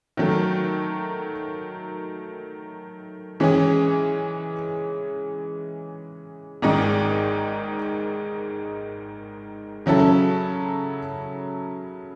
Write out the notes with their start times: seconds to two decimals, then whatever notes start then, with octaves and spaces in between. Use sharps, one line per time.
0.17 D#3 F#3 A3
3.40 E3 G#3 C#4 G#4
6.62 G#1 G#2 D#3 G#3 D#4
9.86 C#3 F#3 C#4 E4 A4